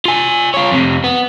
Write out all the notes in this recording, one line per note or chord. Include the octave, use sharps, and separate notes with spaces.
F4 G#5
F4 C#5
F2 C3
B3